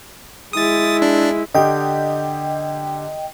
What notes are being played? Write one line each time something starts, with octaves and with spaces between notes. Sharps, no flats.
G#3 E4 D#6 A6
D4
D3 G4 D#5 G5